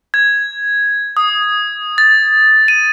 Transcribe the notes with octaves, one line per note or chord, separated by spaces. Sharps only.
G#6
D#6
A6
D#7